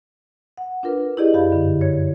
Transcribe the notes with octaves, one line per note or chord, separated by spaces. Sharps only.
F#5
D4 F4 A#4 B4
E4 F4 G4 G#4 D5 D#5
F#2 G4 F5 B5 G6
G2 D3
C#5 G#6